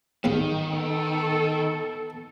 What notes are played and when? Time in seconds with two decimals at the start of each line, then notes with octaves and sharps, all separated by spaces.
0.24 A1 E2 D#3 F5
0.73 B3 A4